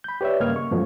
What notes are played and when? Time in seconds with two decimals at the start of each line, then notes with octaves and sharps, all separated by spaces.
0.04 B5 G6
0.21 G4 B4 C#5 D5 E5
0.40 G2 C#3 A#3 D#5 F6 G#6
0.56 C#6
0.71 F#2 B2 F3 F#3 G#3 A3